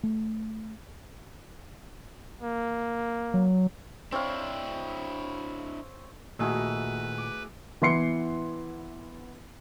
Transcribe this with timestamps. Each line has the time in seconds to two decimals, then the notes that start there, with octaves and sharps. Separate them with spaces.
0.03 A3
2.41 A#3
3.34 F#3
4.12 C4 D4 E4 C#5 F5
6.39 A#2 D#3 A3 E4 F#4 G#4 B4 E5
7.18 D6
7.82 E3 B3 E4 C6 C7 C#7